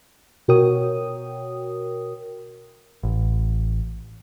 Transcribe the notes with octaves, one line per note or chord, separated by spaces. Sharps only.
B2 F#4 A#4 C#5 G5 D#6
A1